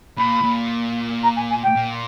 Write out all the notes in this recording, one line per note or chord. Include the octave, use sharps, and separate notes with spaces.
A#2 B5
A#2
A#5
G#5
G#5
G5
A#2